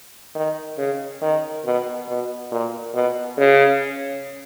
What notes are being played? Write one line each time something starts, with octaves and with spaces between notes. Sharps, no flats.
D#3
C#3
D#3
B2
B2
A#2
B2
C#3